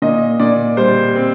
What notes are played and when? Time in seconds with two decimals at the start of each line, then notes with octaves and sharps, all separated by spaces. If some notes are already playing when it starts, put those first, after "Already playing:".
0.02 A#2 D#5
0.40 A#2 D5
0.77 G3 C5
1.15 C4